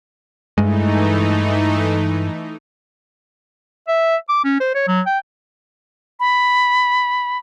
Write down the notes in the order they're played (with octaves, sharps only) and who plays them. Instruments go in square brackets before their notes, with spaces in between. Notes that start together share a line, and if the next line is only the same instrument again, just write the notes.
[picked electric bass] G2 G#3 [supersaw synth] E3 A3 D#4
[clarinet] E5
D6
C#4
C5
C#5
F#3
G5
[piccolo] B5